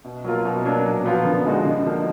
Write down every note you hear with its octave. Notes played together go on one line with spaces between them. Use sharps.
B2
F#3 A#3 F4 A#4
B2
F#3 A#3 D4
A#2
F3 B3 F4 A#4
D3
F3 G#3 D#4 F#4
D3
F3 A#3 D#4